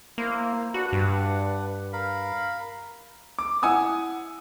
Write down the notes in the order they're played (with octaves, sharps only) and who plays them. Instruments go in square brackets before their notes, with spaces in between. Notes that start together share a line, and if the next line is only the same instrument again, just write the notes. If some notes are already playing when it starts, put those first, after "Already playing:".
[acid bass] A#3 [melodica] E4 C5
[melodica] D4 B4 F#5 [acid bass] F#4
[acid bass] G2
[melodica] A#4 F5 B5
[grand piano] D6
E4 F#5 G#5 D#6 E6